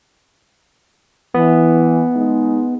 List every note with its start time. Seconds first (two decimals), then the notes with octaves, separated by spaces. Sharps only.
1.34 E3 B3
2.15 G#3 D#4